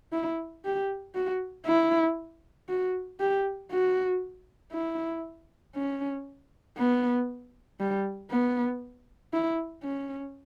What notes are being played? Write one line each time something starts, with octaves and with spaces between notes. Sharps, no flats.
E4
G4
F#4
E4
F#4
G4
F#4
E4
C#4
B3
G3
B3
E4
C#4